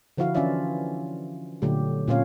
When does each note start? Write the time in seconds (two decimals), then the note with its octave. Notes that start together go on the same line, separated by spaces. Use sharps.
0.17 D3 F3 E4 F#4 F5
0.35 E3 C#4 D4 F4 D5 E5
1.62 A#2 D3 F#3 A3 G4
2.08 A#2 C4 C#4 F4 C#5 F5